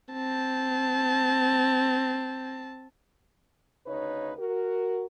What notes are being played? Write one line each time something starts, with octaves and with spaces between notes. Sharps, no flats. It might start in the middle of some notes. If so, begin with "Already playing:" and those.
C4 A5
D2 C#3 D#4 B4 C#5
F#4 A#4